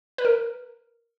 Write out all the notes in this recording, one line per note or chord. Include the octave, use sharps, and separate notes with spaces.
B4
A#4